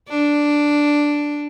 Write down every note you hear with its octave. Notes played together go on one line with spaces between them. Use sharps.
D4